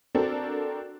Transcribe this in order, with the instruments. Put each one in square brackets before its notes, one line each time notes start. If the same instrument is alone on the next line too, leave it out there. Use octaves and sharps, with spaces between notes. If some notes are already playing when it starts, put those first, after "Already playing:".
[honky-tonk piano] C4 D4 F#4 A4 A#4